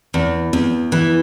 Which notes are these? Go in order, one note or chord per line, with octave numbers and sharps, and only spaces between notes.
E2
E2
E3